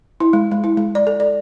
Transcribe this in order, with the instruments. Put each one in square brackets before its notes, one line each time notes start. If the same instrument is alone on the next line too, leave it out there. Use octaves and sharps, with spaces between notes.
[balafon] E4
G#3
G#3
E4
G#3
D5
A4
D5